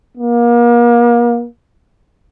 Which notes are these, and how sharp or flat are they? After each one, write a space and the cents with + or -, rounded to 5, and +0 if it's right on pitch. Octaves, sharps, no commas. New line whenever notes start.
A#3 +35